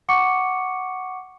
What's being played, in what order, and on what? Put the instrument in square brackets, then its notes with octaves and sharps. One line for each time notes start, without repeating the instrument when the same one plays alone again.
[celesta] F#5 C#6 D6 C#7